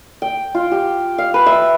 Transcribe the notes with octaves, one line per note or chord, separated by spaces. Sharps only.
G5
F4
G4
F5
B4
E5